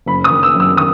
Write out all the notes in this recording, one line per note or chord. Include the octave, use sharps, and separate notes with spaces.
F#1 B5
D#6
D#3
E6
F#2
E6
D#3 D#6